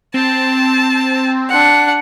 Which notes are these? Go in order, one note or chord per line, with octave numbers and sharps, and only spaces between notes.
C4 A5
D4 F#5